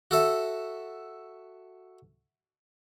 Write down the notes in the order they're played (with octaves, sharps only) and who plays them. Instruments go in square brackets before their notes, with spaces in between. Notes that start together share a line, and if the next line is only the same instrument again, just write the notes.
[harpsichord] F#4 A4 E5